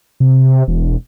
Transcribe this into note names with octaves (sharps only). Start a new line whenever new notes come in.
C3
E1